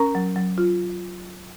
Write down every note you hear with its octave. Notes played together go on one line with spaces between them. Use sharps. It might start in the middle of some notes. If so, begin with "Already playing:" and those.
Already playing: C#4 A#4 A#5
F#3
F#3
F4